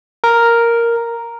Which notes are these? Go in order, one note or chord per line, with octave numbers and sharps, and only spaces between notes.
A#4